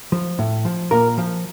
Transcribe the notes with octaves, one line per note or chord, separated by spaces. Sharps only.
F3
A2
F3
A#2 A#4
F3